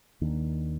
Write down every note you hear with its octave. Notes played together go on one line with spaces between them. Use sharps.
D#2 D#3 A#3 D4